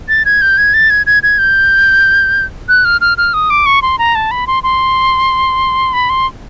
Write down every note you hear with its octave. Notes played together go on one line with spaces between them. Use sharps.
A6
G#6
G6
G#6
A6
G#6
G#6
G#6
G6
F#6
F6
F6
F6
D#6
D6
C#6
C6
A#5
A5
B5
C6
C6
B5
C6